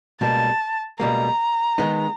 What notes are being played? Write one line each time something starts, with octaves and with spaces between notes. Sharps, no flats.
C#2 B2 G3 A#3 A5
C#2 B2 G3 A#3 A#5
D#3 G#3 B3 D#4